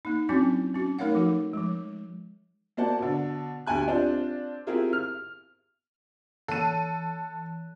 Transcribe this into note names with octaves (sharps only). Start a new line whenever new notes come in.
A#3 D#4
F#3 C4 C#4 E4 F#4
C#4 F#4
A3 D#4 A#4 C#5 F5 F#5
F3 D#4 F#4 A4
F3 G#3
A#3 F#4 C5 D5 F#5 A5
B2 D3
D2 G4 G#5 F#6
C4 D4 F4 G4 C5
C4 E4 F4 G4 G#4 A#4
F6
E3 A4 F#6 D#7